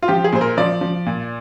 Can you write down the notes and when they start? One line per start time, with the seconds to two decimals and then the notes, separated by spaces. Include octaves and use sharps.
0.03 F4
0.08 F3 G4
0.24 G#4
0.32 A#2 C5
0.41 A#4
0.57 F3 D5
0.81 F3
1.06 A#2